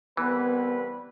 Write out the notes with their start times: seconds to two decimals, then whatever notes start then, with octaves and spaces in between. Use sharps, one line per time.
0.17 C2 E3 B3 B4